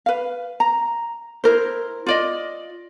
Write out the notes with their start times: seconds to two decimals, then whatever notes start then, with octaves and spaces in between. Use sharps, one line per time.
0.06 B4 F5
0.60 A#5
1.44 E4 A#4 C5
2.06 F4 D5 D#5